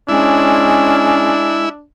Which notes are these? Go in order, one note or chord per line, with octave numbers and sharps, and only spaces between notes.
G#3 C#4 D4 E4